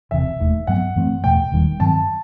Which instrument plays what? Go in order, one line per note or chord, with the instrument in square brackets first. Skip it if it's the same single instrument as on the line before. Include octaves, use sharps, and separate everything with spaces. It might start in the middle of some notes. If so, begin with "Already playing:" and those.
[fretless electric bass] E1 E2 C3 [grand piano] E5
[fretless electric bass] E1 D#2 D#3 A3
[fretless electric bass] G2 F#3 B3 [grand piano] F#5
[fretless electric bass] F#2 E3 A3 C4
[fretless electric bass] E2 B2 A3 [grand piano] G5
[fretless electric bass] E1 D#2 D#3 G3
[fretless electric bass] G2 D#3 F#3 C4 [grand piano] A5